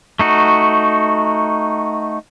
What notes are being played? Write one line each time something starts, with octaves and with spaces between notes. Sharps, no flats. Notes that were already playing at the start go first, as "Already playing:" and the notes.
A3 D#4 F#4